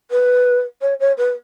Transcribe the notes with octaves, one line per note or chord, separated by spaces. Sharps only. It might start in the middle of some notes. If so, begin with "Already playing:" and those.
B4
C#5
C#5
B4